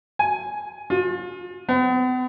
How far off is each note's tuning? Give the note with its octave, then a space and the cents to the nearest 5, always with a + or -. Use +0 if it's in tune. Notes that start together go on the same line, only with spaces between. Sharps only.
G#5 +10
F4 +35
B3 +45